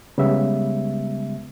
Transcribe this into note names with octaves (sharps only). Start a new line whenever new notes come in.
C#3 G3 G#3 B3 E5